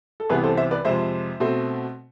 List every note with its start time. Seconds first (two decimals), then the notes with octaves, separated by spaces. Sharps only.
0.20 A4
0.29 C2 C3 E3 B3 G#4 B4
0.44 A4 C5
0.57 C5 E5
0.71 B4 D5
0.85 F2 C3 G#3 C5 E5
1.40 B2 A3 C4